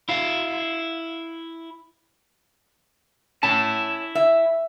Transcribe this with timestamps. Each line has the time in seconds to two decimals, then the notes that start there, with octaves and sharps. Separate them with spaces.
0.09 E4 F5
3.43 C#4 E4 A5
4.15 E5